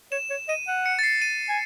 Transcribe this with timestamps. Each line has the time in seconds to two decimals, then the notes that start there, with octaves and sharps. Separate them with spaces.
0.12 C#5 E7
0.30 C#5
0.48 D#5 D#7
0.68 F#5
0.86 C#7
0.99 A6
1.03 C7
1.22 D#7
1.49 G#5